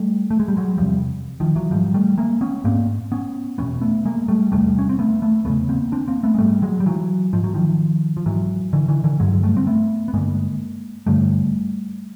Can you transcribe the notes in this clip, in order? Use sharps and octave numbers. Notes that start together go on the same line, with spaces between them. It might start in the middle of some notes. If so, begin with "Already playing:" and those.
Already playing: G3 A3
A3
G#3
G3
F#3 G#3
E2 C3 F3 G3
D#3 F3
E3 F#3
G#2 F3 G3
G3 A3
G#3 A#3
B3 C#4
G#2 A#3 C4
B3 C#4
E2 B2 B3 C#4
A3 B3
G#3 A#3
G3 A3
E2 C3 G3 A3
C#4
C4
A3 B3
A3 B3
E2 C#3 A3 B3
A#3 C4
C4 D4
A#3 C4
A3 B3
G#3
G#2 G3 A3
F#3 G#3
G3
E3 F#3
G#2 F3
F#3
D#3 F3
F3
G#2 E3 F#3
D3 E3
D3 E3
D3 E3
G2 D3 F#3 G#3
G3 A3
C4
A3 B3
B3
G2 D3 G#3 A#3
G2 D3 G3 A3